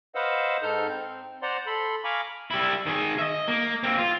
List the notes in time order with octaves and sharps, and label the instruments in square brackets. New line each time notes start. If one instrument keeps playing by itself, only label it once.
[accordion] B4 C5 D#5 F5 F#5 E6
G#2 D#4 A4 F6 G6
C4
C5 D5 F#5 A#5 C6
A4 B5 C6
F5 G#5 A#5 B5 C#6 D6
[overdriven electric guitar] G3 E4
D#3 G#4
D#5 E5
A#3
A#3 C4
F4